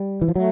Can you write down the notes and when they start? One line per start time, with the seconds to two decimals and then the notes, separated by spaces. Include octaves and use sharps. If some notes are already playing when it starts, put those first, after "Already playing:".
Already playing: G3
0.22 E3
0.28 F3
0.36 F#3 A3